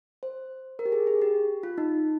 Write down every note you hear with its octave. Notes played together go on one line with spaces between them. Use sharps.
C5
A#4
G4
G#4
G#4
G4
F4
D#4